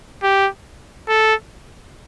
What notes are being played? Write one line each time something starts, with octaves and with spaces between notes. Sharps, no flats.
G4
A4